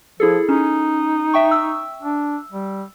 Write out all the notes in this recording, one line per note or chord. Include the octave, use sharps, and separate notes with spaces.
F3 E4 G#4 A4
C#4 D#4
E5 G5 C#6
E6
D4
G3